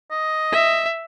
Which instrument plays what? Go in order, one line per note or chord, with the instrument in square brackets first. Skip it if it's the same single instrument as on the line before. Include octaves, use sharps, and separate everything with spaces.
[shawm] D#5
[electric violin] E5